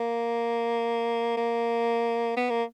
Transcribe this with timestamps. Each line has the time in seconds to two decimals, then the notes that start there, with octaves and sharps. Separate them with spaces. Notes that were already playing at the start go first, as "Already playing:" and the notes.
Already playing: A#3
1.37 A#3
2.37 B3
2.50 A#3